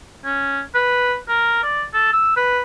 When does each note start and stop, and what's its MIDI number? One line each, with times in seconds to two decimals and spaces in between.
0.25 0.60 61
0.74 1.15 71
1.28 1.61 70
1.63 1.83 74
1.93 2.12 69
2.13 2.33 88
2.36 2.63 71